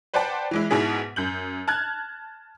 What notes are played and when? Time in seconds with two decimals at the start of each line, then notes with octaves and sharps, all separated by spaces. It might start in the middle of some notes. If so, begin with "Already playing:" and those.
0.14 B4 C5 D5 F#5 G5 A5
0.51 E3 G#3 E4
0.70 G#2 B2 E4 G#4 B6
1.16 F#2 G6 F#7
1.68 A5 F6 F#6 G#6